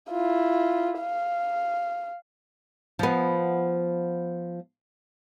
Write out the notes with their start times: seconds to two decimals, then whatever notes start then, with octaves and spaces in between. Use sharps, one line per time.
0.10 E4 F4
1.00 F5
2.99 F3 B3